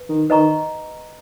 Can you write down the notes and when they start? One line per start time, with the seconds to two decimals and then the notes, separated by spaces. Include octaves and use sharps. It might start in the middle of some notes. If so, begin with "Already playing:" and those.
Already playing: B4
0.09 D#3
0.30 D#3 B4 D#5 A#5 C#6